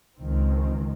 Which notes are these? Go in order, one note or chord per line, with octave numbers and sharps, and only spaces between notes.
C#2 D#3 C4